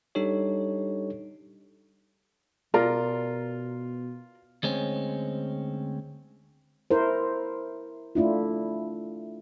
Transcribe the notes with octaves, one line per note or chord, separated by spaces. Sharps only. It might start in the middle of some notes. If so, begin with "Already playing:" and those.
G3 D4 D#4 G4 A4 C#5
B2 F4 A#4 D5 A#5
D2 G#3 C4 C#4
E4 A#4 C5
A3 D4 E4 F4